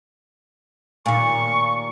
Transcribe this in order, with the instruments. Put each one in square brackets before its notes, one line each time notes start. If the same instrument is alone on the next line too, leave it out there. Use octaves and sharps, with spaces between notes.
[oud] D#2 A#2 [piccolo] C#6